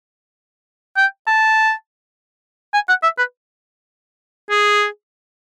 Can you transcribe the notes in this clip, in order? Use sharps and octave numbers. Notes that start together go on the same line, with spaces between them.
G5
A5
G#5
F#5
E5
B4
G#4